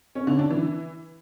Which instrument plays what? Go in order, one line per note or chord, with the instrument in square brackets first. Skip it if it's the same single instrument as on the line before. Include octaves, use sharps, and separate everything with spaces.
[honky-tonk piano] C#4
D3
D4
E3